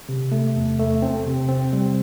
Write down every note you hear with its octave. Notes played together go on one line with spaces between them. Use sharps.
C3
A3
E2
A3
C4
C3
C4
G3